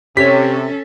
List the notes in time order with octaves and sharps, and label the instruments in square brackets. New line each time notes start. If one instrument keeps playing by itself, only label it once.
[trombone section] C3 [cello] C#4 A4 [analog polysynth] G4 C#5 [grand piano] B6